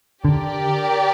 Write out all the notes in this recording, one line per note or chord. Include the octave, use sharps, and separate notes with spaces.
D3 G4 A#4 D5